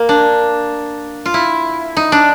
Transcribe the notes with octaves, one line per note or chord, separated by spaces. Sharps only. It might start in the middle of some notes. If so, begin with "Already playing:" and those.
Already playing: A#3
D4
F4
E4
D#4
D4